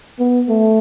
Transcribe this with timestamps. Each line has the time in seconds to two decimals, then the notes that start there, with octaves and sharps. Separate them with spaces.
0.19 B3
0.49 A3